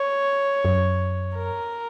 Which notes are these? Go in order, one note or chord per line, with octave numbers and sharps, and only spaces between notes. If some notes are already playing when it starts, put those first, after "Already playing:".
Already playing: C#5
F#2
A#4